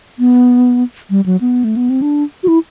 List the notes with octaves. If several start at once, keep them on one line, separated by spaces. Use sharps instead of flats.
B3
G3
F#3
B3
A3
B3
C4
D4
F#4
E4